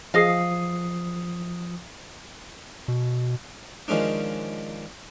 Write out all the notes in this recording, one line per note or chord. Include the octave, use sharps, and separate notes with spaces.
F3 G#4 D#5 F5 D#6 C7
B2
D#3 F3 G#3 C#4 D4